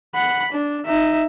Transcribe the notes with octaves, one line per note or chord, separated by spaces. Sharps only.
F#5 B5
D4
D#4 E5